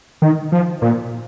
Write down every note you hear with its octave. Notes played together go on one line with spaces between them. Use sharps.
D#3
F3
A#2